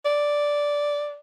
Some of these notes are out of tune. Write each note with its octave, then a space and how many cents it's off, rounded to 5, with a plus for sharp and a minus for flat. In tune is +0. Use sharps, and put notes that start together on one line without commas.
D5 -5